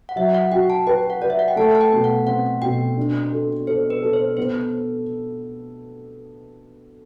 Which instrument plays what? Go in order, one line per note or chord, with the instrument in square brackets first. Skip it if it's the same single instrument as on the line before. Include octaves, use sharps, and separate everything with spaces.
[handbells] F#5
[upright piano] F#3 [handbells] E5
[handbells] F#5
[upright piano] F#4 [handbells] G5
[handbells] A5
[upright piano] B4 [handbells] G5
[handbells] F#5
[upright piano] B4 [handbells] D5
[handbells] E5
F#5
G5
[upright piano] A3 [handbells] A5
[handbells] A5
G5
[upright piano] B2
[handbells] F#5
[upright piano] C4 [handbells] F#5
[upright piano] B2 [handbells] G5
[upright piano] D4
A4
[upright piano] A4 [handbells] C5
[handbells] B4
[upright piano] A4
[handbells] C5
[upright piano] B3 [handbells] C5